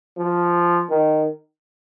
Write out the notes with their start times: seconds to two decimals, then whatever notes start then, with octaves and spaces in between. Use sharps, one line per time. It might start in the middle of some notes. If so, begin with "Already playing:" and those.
0.18 F3
0.90 D#3